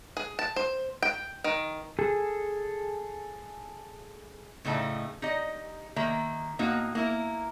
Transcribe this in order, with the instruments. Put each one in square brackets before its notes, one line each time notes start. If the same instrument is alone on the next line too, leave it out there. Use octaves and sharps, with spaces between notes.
[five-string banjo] G#4
A5
C5
G5
D#3
[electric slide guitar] G#4 A4
[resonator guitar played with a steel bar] A2 C#3 A3 D#4 A5
D#4 G4 D#5
D#3 A#3 E5 A#5
A2 A#3 D#4 F#4
A#3 E4 A#4